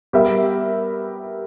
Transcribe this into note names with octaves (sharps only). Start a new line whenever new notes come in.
G3 B3 G4 A#4 E5